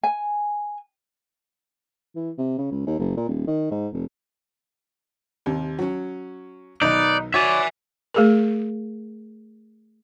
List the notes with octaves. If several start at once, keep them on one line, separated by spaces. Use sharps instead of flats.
G#5
E3
C3
C#3
C#2
D#2
F#1
A#2
D#1
D#3
G#2
F1
D#2 C3
F#3 C#4
B1 D#3 D#4 B4 D5 D#5
F#4 C#5 D5 E5 G#5
A3 G#4 A#4